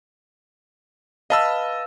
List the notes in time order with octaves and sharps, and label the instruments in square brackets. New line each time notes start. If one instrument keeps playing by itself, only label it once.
[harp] B4 F5 [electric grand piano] D#5 A5 E6